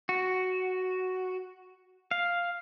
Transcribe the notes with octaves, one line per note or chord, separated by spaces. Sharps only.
F#4
F5